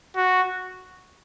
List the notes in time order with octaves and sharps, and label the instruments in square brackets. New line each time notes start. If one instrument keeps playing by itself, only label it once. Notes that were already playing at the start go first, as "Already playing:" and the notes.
[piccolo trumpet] F#4